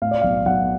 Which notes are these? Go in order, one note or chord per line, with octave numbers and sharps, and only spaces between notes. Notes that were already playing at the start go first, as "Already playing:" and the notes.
A2 F5
D5
B1 F5
B1 F#5